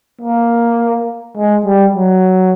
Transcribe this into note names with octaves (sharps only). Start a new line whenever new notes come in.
A#3
G#3
G3
F#3